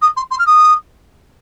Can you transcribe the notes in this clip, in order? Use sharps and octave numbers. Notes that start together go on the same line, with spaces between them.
D#6
C6
C6
F6
D#6